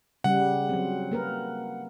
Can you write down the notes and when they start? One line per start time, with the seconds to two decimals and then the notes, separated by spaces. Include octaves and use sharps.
0.24 C#3 G3 F#5
0.69 F#3 C4
1.12 A#3 A#4 B4